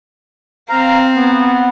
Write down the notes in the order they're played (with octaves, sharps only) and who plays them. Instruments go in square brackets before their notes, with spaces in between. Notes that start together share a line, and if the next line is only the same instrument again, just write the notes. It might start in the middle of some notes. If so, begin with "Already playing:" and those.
[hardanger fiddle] C4 [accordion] F5 A#5
[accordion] B3